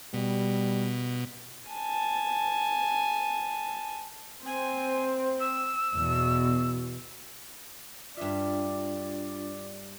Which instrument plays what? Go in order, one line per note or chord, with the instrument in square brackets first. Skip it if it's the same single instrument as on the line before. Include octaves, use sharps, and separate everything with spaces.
[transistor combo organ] B2 [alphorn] G3
[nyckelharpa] G#5 A5
[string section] C4 [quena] G#5
[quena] E6
[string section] E2 B2
[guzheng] G2 E5 [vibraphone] D4 F4 [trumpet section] D5